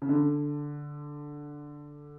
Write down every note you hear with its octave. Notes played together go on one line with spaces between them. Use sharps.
C#3
D3